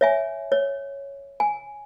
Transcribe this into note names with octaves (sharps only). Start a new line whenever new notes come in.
C#5 E5 G#5
C#5
G#5